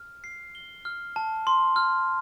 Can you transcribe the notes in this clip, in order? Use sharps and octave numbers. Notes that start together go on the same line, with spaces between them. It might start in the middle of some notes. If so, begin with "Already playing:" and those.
Already playing: F6
C7
G7
F6
A5
C6
F6